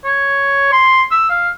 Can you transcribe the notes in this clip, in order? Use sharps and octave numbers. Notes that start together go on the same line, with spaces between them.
C#5
C6
E6
F5